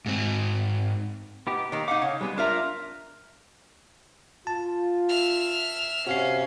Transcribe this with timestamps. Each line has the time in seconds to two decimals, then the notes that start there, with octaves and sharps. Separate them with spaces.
0.06 G#2 C4
1.47 B3 D#4 G4
1.72 D#3 A#3 G4
1.88 D#4 F5 F#5 D6
2.02 C#3 C#5
2.21 G3 G#3 B3
2.38 D4 F4 A#4 E5 F5 A#5
4.47 F4 A5
5.09 E5 F6
6.07 C3 C#4 F#4 F5 C7